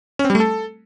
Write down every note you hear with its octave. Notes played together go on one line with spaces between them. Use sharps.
C#4
C4
G3
A3
A4